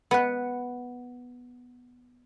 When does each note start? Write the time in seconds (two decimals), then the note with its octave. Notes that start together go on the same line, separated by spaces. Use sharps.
0.11 B3 F#5